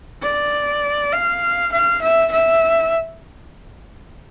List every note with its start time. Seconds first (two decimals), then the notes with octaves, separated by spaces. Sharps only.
0.23 D5
1.12 F5
1.72 F5
2.01 E5
2.31 E5